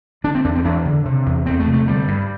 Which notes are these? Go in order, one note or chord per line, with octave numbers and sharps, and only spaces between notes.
D3 D4
C4
E2 D4
C4
E2 D4
D3
C3
E2
E2 C4
A3
C3
A3
D3 G3
G2